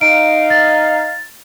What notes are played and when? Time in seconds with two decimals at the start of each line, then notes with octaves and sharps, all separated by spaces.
0.01 D#4 F5 D7
0.50 A6